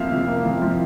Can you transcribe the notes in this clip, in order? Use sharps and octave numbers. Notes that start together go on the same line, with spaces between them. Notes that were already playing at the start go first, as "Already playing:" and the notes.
Already playing: F2 F3 A#3 E5 F5
C3
A#3
F2
F3